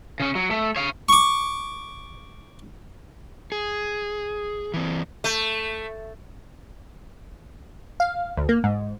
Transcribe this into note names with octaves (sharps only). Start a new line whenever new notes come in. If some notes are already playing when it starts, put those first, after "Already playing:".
C#3 C#4
F#3
A3
C#5 F5
C#6 D6
G#4
E3 C4
A3
F5
D2
A#3
G#2